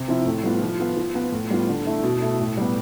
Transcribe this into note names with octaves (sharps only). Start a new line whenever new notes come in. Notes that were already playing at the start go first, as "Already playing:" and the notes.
Already playing: C3
F3 C4 E4
A2
G3 B3 F4
F3
B3 F4
F3
B3 F4
A2
G3 B3 F4
D3
A3 E4
B2
A3 E4
A2
G3 B3